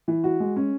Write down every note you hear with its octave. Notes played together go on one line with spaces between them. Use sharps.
E3
F#4
G#3
C#4